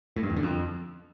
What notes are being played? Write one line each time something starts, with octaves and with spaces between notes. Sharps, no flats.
A2
G2
E2
D3
F2